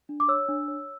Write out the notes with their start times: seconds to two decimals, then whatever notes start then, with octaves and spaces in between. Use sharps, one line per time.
0.09 D4
0.20 D6
0.28 C#5 E6
0.48 D4
0.68 C#5